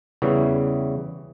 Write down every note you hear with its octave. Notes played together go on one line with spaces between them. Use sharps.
E2 C#3 E3 G3